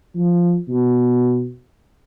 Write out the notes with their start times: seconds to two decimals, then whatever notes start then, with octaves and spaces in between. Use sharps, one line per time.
0.15 F3
0.68 B2